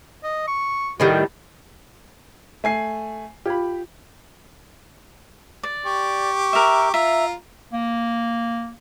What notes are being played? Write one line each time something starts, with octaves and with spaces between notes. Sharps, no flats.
D#5
C#6
A2 D#3 G3 F#4
A3 G#5 C7
F4 G4 F5 B5 G#6
D5
G4 C#6
A#4 E5
F4 E5 A#5
A#3